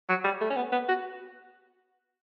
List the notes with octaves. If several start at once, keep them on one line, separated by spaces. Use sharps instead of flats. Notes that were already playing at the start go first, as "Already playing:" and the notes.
F#3
G3
A3
C#4
B3
B3
F#4